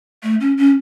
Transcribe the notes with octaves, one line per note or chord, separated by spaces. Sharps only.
A3
C#4
C#4